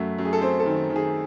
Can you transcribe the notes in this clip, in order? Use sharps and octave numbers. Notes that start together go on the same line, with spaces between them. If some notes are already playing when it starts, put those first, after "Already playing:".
Already playing: F#2 A3 F#4
F#2
G#4
A4
C4 C5
A4
D#3
D#3
G#4